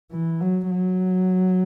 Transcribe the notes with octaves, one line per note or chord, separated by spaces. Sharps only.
E3
F#3
F#3